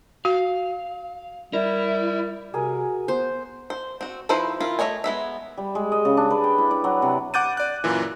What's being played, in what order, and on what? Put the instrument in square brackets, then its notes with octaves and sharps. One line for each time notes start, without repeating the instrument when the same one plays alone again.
[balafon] F#4 [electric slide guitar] F5
[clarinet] G3 [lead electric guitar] E4 [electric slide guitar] A#4
[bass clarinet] C3 [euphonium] F#4 [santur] G#4 A#4 G#5
[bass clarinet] B3 [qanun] C5
[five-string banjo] C5
C4 F#4
F3 D#4 E4 B4 C5
D#3 E4 F4
A3 C#5 D#5 G#5
G#3 B3 E5
[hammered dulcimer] G3
G#3
D#5
C#3
D4
B4
G5
E4
D5
F#3
C3
[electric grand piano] F#5 D6 F#6 G6 A6 D#7
D5 F#6
F#2 A#2 E3